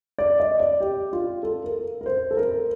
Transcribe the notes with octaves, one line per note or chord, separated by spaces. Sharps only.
D5
D#5
D5
G4
F4
A4
A#4
A#4
C5
A4
A#4